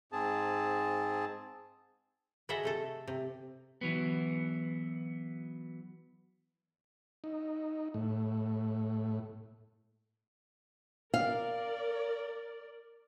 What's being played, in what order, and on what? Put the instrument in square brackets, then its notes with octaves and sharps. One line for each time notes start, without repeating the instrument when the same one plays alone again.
[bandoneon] G#2 C4 G#4 A5
[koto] F#4 G#4 A4 D#5 E5 F#5
C3 A3 A4
C3
[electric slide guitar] E3 F#3 B3
[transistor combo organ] D#4
A2
[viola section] A#4 D5 [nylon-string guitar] F5